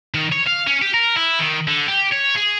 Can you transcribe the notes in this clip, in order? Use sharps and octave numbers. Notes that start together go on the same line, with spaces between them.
D#3
C#5
F5
C#4
G4
A#4
E4
D#3
D3
G4
C#5
G#4